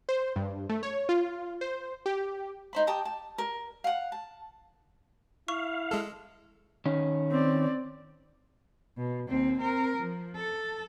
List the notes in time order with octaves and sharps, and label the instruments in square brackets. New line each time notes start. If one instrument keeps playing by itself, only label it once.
[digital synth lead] C5
G2
A3
C#5
F4
C5
G4
[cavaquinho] D#4 C5 B5
G4 A5 A#5 D#6
A5
A#4
F5 F#5
A5
[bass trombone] E4 [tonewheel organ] F5 [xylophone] C#6
[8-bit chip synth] G#3 A4
[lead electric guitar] D#3 C#4
[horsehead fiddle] C4 D5
[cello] B2
D#2 C4
C4 A#4
F3
A4